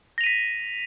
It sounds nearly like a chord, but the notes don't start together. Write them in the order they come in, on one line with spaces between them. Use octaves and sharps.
A#6 F7 D#7 B6